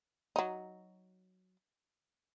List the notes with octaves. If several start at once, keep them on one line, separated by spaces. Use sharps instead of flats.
F#3 D#4